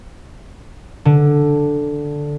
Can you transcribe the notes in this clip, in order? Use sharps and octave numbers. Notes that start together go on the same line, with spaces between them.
D3